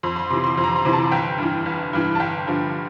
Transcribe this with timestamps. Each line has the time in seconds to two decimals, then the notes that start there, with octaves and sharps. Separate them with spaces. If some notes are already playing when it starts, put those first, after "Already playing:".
0.03 F2 C6
0.16 C6
0.30 C3 E3 C6
0.44 C6
0.57 F2
0.64 A#5
0.76 C6
0.85 C3 E3
0.93 A5
1.11 G1 G5
1.38 G2 E3
1.66 G1
1.93 G2 E3
2.15 A5
2.20 G1 G5
2.47 G2 D3 F3